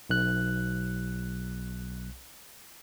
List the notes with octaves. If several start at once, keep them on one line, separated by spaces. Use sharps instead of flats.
B1 F#6